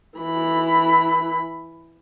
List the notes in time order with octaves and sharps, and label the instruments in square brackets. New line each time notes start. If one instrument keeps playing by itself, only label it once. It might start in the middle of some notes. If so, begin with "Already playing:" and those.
[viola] E3 B5